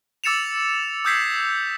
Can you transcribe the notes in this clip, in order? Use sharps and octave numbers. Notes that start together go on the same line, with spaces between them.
D6 E6 A6 C#7 E7 F7
D#6 E6 G6 G#6 B6 C7